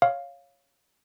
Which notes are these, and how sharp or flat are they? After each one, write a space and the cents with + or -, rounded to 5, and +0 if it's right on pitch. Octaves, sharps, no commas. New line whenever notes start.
C#5 +0 F5 +0